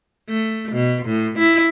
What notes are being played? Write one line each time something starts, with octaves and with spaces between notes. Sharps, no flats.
A3
B2
A2
E4